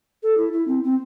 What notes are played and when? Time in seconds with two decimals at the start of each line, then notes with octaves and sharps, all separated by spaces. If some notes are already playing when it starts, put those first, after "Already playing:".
0.23 A4
0.37 E4
0.53 E4
0.68 C4
0.84 C4